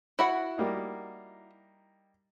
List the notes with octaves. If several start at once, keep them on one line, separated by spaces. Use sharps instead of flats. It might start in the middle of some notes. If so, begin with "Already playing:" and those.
E4 F#4 F#5
G3 A#3 D#4